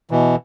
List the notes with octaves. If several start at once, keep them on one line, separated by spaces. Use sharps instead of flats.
B2 E3